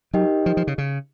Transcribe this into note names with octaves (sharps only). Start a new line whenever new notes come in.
F#3 D#4 G4 A#4 D#5 G5
F3
F3
C#3
C#3